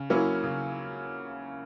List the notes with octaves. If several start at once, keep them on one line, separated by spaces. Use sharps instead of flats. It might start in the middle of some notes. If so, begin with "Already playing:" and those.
Already playing: C#3
F#3 A#3 C#4 E4
C#3